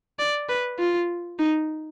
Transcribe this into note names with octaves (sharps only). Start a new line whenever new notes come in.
D5
B4
F4
D#4